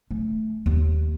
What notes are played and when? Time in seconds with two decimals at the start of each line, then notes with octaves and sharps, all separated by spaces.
0.11 A3
0.66 D#2